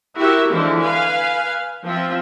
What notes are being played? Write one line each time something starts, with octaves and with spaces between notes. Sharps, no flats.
E4 F#4 G4 A#4 E5
D3 E3 F3 G#3 E4
B4 F5 G#5
F3 C4 F4 E5